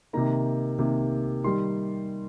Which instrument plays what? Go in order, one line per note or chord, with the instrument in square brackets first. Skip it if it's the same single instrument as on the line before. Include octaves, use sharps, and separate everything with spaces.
[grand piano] C3 D#3 A#3 A#5
C3 D#3 A#3
D#3 G3 C6